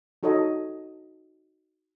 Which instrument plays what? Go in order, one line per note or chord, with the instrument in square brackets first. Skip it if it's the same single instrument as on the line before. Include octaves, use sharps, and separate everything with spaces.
[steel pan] D#4 F#4 A4 C#5 D#5 A#5